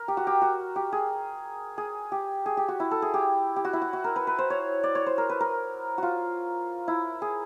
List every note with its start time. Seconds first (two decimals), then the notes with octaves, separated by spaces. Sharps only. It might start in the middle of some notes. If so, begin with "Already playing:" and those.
Already playing: A#4
0.08 G4
0.17 F#4
0.27 G4
0.42 F#4
0.76 G4
0.92 G#4
1.78 G#4
2.12 G4
2.46 G#4
2.57 G4
2.68 F#4
2.80 E4
2.91 A4
3.02 G#4
3.14 G4
3.56 G4
3.65 F#4
3.73 E4
3.82 F#4
3.93 F#4
4.04 A#4
4.16 B4
4.27 B4
4.39 C5
4.50 C#5
4.83 D5
4.95 C#5
5.06 C5
5.18 A#4
5.29 B4
5.41 A#4
5.98 F4 F#4
6.88 E4
7.22 G#4